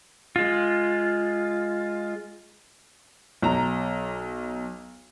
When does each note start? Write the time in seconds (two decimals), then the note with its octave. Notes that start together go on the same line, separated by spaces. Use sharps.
0.36 G#3 F4
3.42 B1 A#5